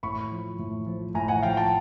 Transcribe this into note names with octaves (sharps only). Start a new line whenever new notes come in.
A2 B5 C#6
F3
A2
F3
A2 G#5 A#5
F#5 G#5
F3 F5 G5
G5 A5